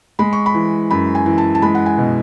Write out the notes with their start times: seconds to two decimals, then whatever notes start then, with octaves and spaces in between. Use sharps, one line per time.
0.19 G#3 B5
0.33 C#6
0.46 B5
0.54 E3
0.90 F#2 B5
1.15 G#5
1.26 E3
1.38 A5
1.55 A5
1.62 G#3 B5
1.75 F#5
1.86 G#5
1.98 B2